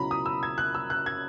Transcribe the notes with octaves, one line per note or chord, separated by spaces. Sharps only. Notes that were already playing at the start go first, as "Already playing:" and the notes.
Already playing: C#2 B2 F#3 C#4 E4 A#5 B5
D#6
E6
G#6
F#6
E6
F#6
G#6